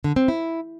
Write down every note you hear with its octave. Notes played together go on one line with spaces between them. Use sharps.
D3
C4
E4